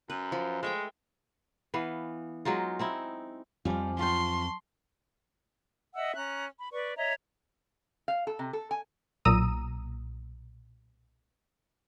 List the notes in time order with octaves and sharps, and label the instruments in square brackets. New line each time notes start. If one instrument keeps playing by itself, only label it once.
[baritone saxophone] F#2 [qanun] B4
[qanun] F3
[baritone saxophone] G#3 [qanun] A3 E5 G5
[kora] E3 B3 F5
F#3 G#3 D#4 F4
C4 D#4 E4
[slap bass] F2 F3 [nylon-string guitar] G3 F4 [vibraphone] G#5 A5 D6
[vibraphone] F#3 A5 C#6 [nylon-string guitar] F4 G5 [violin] C6
[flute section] D#5 E5 F#5 E6
C#4 A#5 F#6
B5
B4 D5 C#6
C#5 D#5 E5 A#5
[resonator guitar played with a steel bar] F5
A4
C3
A4
G#5
[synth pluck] B1 A#2 A#5 D#6 E6 D#7